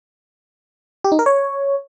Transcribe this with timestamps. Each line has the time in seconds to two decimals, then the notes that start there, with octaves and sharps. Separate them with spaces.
1.04 G4
1.12 D#4
1.19 A#4
1.26 C#5